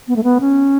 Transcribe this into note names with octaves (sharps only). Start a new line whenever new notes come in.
B3
A3
B3
C#4